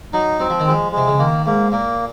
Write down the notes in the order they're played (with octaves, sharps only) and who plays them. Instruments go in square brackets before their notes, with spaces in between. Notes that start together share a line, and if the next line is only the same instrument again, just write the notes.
[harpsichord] F#3 [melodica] D#4
[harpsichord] F#3 [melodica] C4
[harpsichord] F3
D#3
[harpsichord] F3 [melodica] G#3
[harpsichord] C3 [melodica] G#3
[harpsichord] C#3
[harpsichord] D#3 [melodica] A#3
[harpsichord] G#2 [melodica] A#3
[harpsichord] A#2 [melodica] A#3